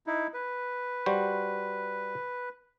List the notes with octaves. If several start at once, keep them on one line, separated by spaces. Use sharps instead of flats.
D#4 E4
B4
G3 F#4 C5